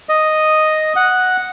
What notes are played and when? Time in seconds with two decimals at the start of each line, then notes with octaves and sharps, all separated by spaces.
0.09 D#5
0.96 F#5